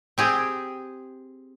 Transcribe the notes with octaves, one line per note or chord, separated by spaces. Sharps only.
C4 G4 G#4